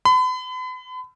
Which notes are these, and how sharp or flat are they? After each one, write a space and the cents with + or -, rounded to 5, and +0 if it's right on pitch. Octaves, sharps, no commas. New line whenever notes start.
B5 +40